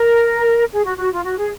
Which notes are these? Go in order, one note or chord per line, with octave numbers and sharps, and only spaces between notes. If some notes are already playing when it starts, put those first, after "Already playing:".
Already playing: A#4
G#4
F#4
F#4
F4
F#4
G#4